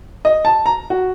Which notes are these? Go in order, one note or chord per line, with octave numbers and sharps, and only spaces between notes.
D#5
A5
A#5
F#4